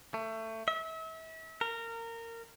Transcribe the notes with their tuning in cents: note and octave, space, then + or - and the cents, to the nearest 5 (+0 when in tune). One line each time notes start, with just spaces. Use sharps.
A3 +20
E5 -35
A#4 -20